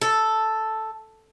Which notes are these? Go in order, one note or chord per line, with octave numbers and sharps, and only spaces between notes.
A4